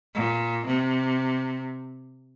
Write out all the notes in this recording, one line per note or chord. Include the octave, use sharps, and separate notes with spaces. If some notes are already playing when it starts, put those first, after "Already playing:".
A#2
C3